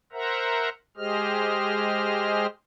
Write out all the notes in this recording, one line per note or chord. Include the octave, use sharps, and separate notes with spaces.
A#4 C5 E5 F#5 A#5
G#3 G4 G#4 C5 D#5 F6